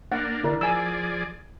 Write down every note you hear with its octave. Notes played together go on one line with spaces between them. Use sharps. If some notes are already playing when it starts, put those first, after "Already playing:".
A#3 D4 F#5
D3 E4 A#4 D5
F3 G#4 D5 G#5 E6